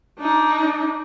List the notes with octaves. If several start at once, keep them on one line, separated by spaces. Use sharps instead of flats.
D4 D#4